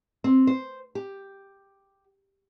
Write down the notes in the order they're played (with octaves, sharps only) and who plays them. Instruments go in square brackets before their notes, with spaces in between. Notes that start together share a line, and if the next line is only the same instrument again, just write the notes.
[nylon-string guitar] C4
C5
G4